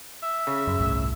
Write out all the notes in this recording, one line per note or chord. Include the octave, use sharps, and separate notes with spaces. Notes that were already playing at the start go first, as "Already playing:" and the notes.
E5
C#3
F#2
G1 C2 A2